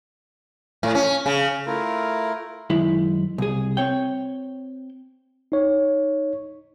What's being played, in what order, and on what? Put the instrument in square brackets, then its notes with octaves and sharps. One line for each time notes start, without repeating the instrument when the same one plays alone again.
[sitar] A2
C#4
C#3
[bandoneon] A3 E4 F4 A#4
[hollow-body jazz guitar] F#2 D#3 G#3 E4
C2 G#4
C4 C#5 G5
[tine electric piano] D#4 C#5